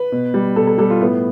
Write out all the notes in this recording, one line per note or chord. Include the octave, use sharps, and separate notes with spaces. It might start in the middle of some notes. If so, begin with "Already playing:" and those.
Already playing: B4
B2
G3
B2 A4
A4
G3 A4
F4
A2 B3